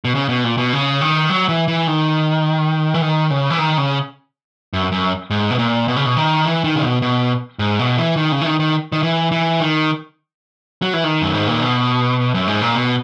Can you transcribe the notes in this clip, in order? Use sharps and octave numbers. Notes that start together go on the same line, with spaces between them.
B2
C#3
B2
A#2
B2
C#3
D#3
F#3
E3
E3
D#3
E3
D#3
C#3
E3
D#3
C#3
F#2
F#2
G#2
B2
A#2
B2
C#3
B2
D#3
E3
D#3
C#3
B2
B2
G#2
B2
E3
D#3
C#3
E3
D#3
D#3
D#3
E3
E3
D#3
F#3
E3
D#3
F#2
G#2
A#2
B2
F#2
G#2
A#2
B2